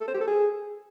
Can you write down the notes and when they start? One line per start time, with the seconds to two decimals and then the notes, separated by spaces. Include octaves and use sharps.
0.01 A4
0.08 C5
0.14 G4
0.21 A4
0.28 G#4